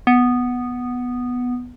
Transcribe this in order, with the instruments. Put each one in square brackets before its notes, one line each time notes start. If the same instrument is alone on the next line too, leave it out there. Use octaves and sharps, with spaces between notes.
[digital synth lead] B3